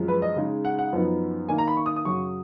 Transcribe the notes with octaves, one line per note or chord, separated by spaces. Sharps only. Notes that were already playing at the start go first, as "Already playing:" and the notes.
Already playing: F#2 F3 G#3
B4
D#5
C#3 G#3 D#4
F#5
F#5
F#2 F3 B3 D#4
D#3 A#3 D#4 G#5
A#5
B5
C#6
D#6
D#6
F#2 C#3 F#3 C#6